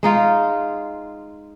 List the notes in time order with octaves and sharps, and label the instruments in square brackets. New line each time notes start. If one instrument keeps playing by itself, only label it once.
[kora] G#3 D#4 F4